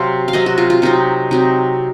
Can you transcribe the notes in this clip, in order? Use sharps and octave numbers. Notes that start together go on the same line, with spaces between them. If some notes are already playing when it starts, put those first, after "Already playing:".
Already playing: C3 F#3 C4 F5
F5
C3 F#3 C4 D#5
F#4
F4
F4
C3 F#3 C4 D#4
C3 F#3 C4 D#4